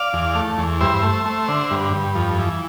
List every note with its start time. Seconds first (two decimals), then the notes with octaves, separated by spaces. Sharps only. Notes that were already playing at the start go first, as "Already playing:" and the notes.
Already playing: D5 F5
0.13 E2
0.35 A3
0.58 E2
0.80 G2 C5 E5
1.03 A3
1.26 A3
1.49 D3
1.70 G2
1.93 G2
2.15 F2
2.39 E3